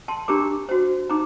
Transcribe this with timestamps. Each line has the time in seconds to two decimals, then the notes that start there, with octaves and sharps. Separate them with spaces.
0.08 A5 C6
0.28 D4 G4 A#4 A#5 D6
0.69 F#4 C5
1.09 D#4 A#5 D6